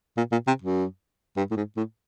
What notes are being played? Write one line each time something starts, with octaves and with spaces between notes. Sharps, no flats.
A#2
A#2
C3
F#2
G2
A2
G#2
A2